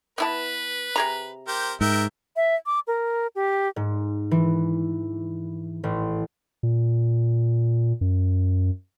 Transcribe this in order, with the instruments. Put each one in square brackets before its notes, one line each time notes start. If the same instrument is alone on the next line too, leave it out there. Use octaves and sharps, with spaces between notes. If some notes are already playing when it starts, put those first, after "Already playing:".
[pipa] B3 E4 A5 [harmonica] B4
[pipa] C3 G#4 A#5
[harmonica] G4 A#4 C5
[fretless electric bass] G#2 [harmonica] A#4 E5 G5
[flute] E5
D6
A#4
G4
[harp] G#2
E3
A1
[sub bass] A#2
F#2